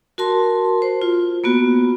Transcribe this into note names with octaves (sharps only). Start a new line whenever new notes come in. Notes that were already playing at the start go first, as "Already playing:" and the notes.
F#4 A#4 A5 C6
C5
F4
A#3 B3 F#4